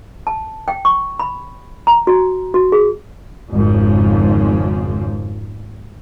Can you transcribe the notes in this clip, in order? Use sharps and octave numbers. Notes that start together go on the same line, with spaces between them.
A5
G5
C#6
B5
A#5
F#4
F#4
G#4
G#1 F2 G#2 C#3 F3